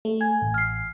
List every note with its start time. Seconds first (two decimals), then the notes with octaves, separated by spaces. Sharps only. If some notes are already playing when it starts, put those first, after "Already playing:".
0.05 A3
0.21 G#5 G#6
0.42 A1
0.54 F6 C7